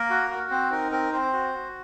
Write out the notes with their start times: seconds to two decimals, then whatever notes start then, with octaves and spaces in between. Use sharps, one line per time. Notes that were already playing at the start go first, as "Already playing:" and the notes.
Already playing: A#3 A#4
0.10 F#4
0.31 F#4
0.50 C4 C5
0.71 D#4 A#4
0.92 C4 A#4
1.13 C4 C5
1.33 F#4
1.54 F#4